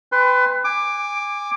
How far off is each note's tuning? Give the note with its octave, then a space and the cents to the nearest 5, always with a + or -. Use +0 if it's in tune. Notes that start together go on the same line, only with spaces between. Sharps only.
B4 +25 G5 +30 C6 +5
G#5 -20 D6 +10